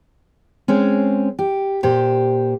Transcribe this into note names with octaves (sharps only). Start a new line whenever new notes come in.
G#3 C4 C#4
G4
A#2 G4 C5